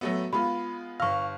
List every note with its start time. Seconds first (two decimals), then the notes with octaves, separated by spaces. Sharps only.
0.01 F#3 A3 B3
0.33 G#3 B3 F4 B5
1.00 G1 F5 C#6 F6